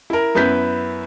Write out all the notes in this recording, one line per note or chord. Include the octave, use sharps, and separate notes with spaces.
E4 A#4
F#2 B3 E4 B4 G6 B6